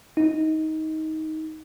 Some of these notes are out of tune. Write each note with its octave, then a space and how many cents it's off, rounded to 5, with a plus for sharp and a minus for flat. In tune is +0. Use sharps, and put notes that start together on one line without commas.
D#4 +20